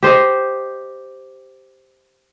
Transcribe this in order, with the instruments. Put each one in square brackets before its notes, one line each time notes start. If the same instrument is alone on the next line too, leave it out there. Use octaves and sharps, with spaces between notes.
[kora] G4 C5 D#5